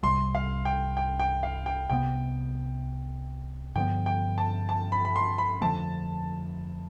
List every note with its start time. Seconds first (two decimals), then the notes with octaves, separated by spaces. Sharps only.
0.03 C2 C3 G3 C6
0.35 F5
0.65 G5
0.97 G5
1.20 G5
1.43 F5
1.66 G5
1.90 C2 C3 E3 B3 G5
3.75 G2 D3 F3 B3 G5
4.06 G5
4.38 A5
4.69 A5
4.92 B5
5.05 B5
5.16 C6
5.38 B5
5.61 F2 D3 F3 A3 A5